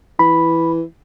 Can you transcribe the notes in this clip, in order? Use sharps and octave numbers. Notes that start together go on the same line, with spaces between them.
E3 B5